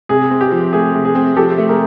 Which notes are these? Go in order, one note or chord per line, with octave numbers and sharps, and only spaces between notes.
C3 G#4
C4
G4
F3
A3 G#4
C3
G#4
C4
F3 G4 A4
A3
G#4 A#4